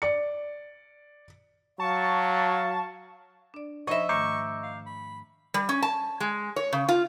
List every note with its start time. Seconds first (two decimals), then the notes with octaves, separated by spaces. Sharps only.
0.02 D5 C#7
1.80 F#3 F5 A5 C#6
3.54 D4 D5
3.87 F3 D#4 C5 D#5 E5 B5 C#6
4.09 G#2 D#3 A3 A#5 C#6 D6 G6
4.63 F5
4.86 B5
5.54 G3
5.69 C#4
5.82 A5
6.20 G#3
6.56 C#5
6.73 C#3
6.89 F4